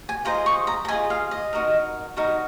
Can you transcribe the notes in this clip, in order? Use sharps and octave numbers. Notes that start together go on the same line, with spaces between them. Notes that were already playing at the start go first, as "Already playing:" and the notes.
G#5
F4 G#4 C5 D#5 A#5
C#6
A#5
A#5
F4 G#4 C5 D#5 G#5
F5
D#5
D#4 F#4 A#4
D#4 F#4 A#4